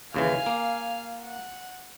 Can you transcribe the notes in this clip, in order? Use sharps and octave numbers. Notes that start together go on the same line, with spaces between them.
D#2 C#3 E3 F5 G#5
A#3
F#5